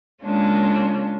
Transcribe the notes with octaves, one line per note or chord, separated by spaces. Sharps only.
C#3 G#3 A#3 C#4 D4 F4